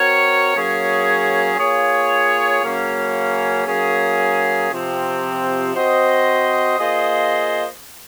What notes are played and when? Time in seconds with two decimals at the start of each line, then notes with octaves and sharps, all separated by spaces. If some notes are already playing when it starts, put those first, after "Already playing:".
Already playing: C4 F#4 A#4 C#5
0.54 F#3 A#3 C#4 G#4 C#5
1.58 A#3 F4 G#4 C#5
2.63 C#3 F#3 A#3 C#4
3.66 F#3 A#3 C#4 G#4
4.71 C3 F3 C4
5.75 C4 F#4 C5 D#5
6.78 A#3 F4 G#4 C5 D#5